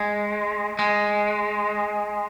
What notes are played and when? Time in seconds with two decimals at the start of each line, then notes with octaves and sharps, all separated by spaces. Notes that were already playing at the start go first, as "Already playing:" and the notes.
Already playing: G#3
0.79 G#3